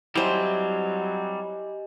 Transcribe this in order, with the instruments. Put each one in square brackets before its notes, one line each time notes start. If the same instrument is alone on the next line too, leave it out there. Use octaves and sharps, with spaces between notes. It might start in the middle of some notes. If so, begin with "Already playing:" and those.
[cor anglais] F#3 [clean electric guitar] G3 C4 [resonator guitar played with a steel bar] E4 C5 [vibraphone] G4 D#5 G#5